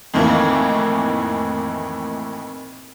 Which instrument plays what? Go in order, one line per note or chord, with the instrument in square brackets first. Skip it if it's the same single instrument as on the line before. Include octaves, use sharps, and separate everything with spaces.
[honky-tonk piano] F2 A2 D#3 E3 A#3